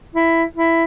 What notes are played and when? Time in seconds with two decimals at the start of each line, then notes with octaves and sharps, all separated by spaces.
0.15 E4
0.56 E4